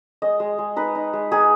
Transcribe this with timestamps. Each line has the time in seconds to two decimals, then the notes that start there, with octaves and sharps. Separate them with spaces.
0.22 G#3 D#5
0.40 G#3
0.58 G#3
0.76 D#4 B4
0.95 D#4
1.13 G#3
1.31 D#4 G#4